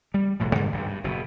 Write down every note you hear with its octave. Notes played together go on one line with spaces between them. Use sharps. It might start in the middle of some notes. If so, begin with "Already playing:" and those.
G3
E1 B1 A2 F3
G2 D3 D#3 G3
G#1 G2 G3
G2
F#1 B2